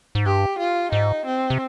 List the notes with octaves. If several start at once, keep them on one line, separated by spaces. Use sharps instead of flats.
G#2
G2 G4
F4
G#2 D#4
C4
C3